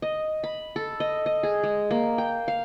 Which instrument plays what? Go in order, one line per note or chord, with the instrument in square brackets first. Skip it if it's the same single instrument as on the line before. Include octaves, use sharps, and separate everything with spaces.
[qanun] D#5
B5
A4
D#5
D#5
G#4
G#3
A#3
G5
F5